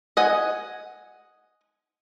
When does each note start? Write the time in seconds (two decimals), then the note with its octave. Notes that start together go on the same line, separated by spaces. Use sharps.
0.17 D#5 F#5 G#5